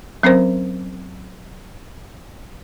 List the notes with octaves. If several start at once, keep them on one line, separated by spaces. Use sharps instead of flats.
F#3 C4 C#4 A#4 C5